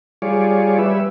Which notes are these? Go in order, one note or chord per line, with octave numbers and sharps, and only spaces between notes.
G3 F4 G#4 C#5 D5
G3 B4 E5